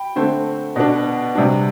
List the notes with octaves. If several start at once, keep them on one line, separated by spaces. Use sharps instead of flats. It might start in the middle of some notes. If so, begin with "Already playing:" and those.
Already playing: G5 B5
D3 A3 C4
B2 B3 D4
C3 G3 D4